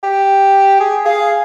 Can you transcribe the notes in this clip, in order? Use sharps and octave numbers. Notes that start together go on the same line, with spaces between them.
G4
G#4
G#4 F5